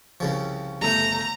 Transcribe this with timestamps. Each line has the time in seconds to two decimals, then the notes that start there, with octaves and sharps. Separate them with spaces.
0.20 C2 C#3 F3
0.81 G1 A3 A#5